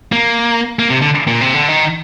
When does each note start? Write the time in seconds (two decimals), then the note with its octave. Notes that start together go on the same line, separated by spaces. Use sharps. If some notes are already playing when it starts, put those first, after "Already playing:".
0.12 A#3
0.79 A#3
0.90 C3
1.02 D3
1.27 A#2
1.41 C3
1.54 D3
1.68 D#3